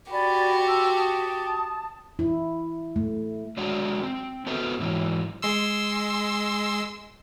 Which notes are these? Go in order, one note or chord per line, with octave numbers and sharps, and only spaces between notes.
F#4 G4 D5 G#5 B5
A5 C6 E6
A5 D#6
E4
A3
F#3 G#3 D4 F#4
C4
B3 F#4 A4 B4 C5
G#2 E3 F#3
G#3 C6 E6